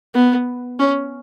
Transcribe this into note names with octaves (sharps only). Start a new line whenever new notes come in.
B3
C#4